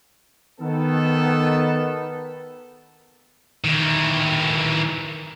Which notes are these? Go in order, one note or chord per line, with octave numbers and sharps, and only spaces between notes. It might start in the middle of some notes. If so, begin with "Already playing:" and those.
D#3 B3 A4
D#3 E3